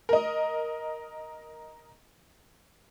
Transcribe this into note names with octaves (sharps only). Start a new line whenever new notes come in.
A#4 D#5